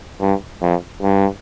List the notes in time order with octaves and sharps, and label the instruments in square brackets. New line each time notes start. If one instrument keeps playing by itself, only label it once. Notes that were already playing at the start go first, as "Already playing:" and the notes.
[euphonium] G2
F2
G2